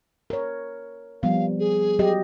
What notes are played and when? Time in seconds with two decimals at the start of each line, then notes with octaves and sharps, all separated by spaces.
0.30 A#4 C#5
1.23 F3 G3 B3 F5
1.59 G#4
1.99 F#3 G4 D#5